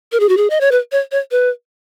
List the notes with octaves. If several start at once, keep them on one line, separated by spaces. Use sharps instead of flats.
A#4
G#4
F#4
G#4
D#5
C#5
B4
C#5
C#5
B4